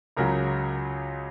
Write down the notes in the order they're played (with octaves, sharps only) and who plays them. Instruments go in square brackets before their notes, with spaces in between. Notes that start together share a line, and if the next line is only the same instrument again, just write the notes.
[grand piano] C#2 C#3 F#3 A#4